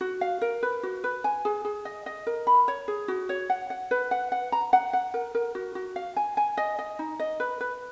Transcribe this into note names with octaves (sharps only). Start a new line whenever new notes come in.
F#4
F5
A#4
B4
F#4
B4
G#5
G#4
G#4
D#5
D#5
A#4
B5
C#5
G#4
F#4
C#5
F#5
F#5
B4
F#5
F#5
A#5
F#5
F#5
A#4
A#4
F#4
F#4
F5
G#5
G#5
D#5
D#5
D#4
D#5
B4
B4